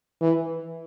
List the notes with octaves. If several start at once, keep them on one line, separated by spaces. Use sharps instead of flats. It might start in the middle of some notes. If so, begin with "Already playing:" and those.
E3